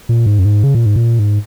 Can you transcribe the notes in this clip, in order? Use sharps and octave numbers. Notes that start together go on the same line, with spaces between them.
A#2
G#2
F#2
G#2
C#3
A#2
G#2
A#2
G#2